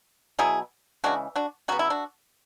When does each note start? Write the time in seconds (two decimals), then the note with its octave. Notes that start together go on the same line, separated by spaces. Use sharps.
0.39 B2 F#3 B3 E4 G#4
1.04 C#3 E3 G#3 D4 F#4
1.36 D4 F#4
1.68 C#3 F#3 B3 F#4
1.79 E4
1.90 D4 F#4